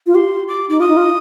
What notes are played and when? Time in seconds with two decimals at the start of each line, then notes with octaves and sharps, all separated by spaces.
0.07 F4
0.15 G4 C6
0.48 D6
0.69 D#4 D6
0.80 F4 D#6
0.89 D#4
0.97 F4